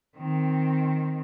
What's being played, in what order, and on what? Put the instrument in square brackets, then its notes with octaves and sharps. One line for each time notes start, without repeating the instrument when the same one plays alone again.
[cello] D#3 C4